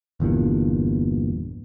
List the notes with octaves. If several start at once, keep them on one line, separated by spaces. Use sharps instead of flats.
G1 E2 G2 A#2